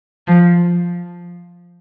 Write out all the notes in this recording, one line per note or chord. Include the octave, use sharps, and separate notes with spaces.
F3